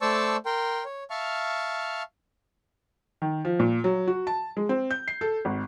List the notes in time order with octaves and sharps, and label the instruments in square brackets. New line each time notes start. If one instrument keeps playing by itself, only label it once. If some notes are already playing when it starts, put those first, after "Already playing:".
[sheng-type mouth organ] A3 C5 D5 A5 C#6 E6
A#4 G5 C6
C#5
E5 F5 A5 C#6 F6
[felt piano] D#3
F3
A#2
F#3
F#4
A5
G#3
C4
G6
C7
A4
G#1